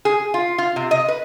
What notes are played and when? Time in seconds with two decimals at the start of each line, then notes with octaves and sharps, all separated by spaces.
0.05 G#4
0.34 F4
0.58 F4
0.76 C3
0.91 D#5
1.08 B4